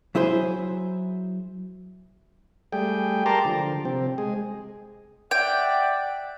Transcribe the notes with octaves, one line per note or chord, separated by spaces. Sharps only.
F#3 E4 G#4 C5
G3 A3 G#4 G5
G4 A#4 A5 A#5 C6 D6
D3 F3
C3 C4
G#3 G#4
D5 E5 F#5 G5